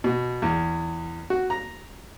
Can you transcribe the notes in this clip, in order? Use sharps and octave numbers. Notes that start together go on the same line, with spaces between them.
B2
E2
F#4
A#5